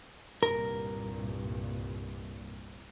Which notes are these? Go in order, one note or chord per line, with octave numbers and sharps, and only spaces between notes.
C2 G2 A#2 A#4